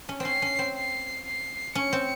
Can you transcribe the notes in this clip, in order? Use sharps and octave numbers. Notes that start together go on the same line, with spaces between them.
C#4
C4 C#4 C7
C#4
C4
C7
C7
C#4 C#7
C4